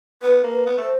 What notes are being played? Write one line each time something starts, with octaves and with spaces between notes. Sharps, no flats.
B3 B4
A#3
B4
B3
A3 C5